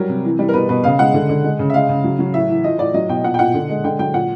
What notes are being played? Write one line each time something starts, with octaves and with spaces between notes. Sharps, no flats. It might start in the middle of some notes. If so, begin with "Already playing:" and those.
Already playing: F#3 G3 A#4
C3
E3
G3
A#4
B2 B4
B2 B4
C#3 F5
G#3 F#5
D3
D3
G#3
C#3
E5
G#3 F5
C#3
F#3
F#3
A2 E5
E3
F3 D#5
A2 D5
F#3 D#5
B2 G5
A#2 F#5
G5
A#2 F#5
D3
G#3
D3 G5
F#3 G5
A#2 F#5